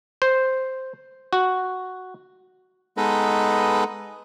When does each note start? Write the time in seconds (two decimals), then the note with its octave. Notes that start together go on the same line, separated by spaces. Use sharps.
0.22 C5
1.33 F#4
2.97 G#3 B3 D#4 A4 B4 D#5